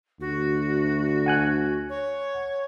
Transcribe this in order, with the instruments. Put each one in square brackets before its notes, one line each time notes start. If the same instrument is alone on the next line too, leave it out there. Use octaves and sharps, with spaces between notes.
[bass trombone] D2 [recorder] F#4
[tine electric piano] F#5 G#5 F#6
[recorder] C#5